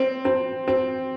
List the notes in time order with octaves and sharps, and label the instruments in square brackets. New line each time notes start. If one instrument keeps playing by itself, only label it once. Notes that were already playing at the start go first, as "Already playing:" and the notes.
Already playing: [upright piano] C4
C4
C4